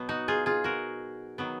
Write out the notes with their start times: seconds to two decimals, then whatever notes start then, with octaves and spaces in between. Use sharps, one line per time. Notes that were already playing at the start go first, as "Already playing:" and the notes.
Already playing: B2 F#3 B3
0.09 D#4 F#4
0.28 F4 G#4
0.46 F4 G#4
0.64 F#4 A#4
1.38 D#3 F#3 B3